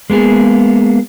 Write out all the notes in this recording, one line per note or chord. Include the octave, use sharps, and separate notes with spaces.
G#3 A#3 B3 G#4